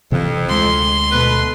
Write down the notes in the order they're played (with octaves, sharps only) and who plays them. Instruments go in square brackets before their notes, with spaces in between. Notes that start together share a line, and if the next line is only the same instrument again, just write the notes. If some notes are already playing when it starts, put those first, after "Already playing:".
[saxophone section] F2 [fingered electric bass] C3 E3 C4
[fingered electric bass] D2 G#3 [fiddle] C6
[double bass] B2 A3 [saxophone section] B4